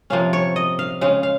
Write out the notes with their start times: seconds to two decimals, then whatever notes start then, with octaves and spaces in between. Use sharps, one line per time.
0.10 C3 F3 A#3 C#4 F5
0.33 C#5
0.56 D#5
0.79 F5
1.01 C#3 G#3 C#4 F5
1.23 F5